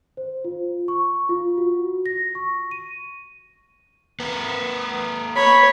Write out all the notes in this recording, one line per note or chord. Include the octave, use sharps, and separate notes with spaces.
C5
F4
C#6
F4
F#4
A#6
C#6
D#7
A#3 B4
C#5 B5